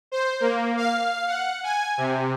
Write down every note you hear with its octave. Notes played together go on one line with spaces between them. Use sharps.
C5
A#3
F5
F#5
G#5
C3